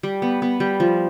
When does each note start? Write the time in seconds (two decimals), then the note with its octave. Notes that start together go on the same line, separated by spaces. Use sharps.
0.03 G3
0.22 B3
0.42 B3
0.60 G3
0.80 F3